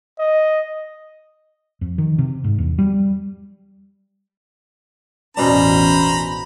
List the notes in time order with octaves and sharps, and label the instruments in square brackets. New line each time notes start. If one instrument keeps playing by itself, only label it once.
[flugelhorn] D#5
[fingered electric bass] F2
D#3
C3
G#2
E2
G3
[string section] A1 E2 [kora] B2 D4 [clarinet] C#4 [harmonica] C5 A#5 B5